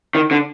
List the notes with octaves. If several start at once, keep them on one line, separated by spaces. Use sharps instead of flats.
D#3
D3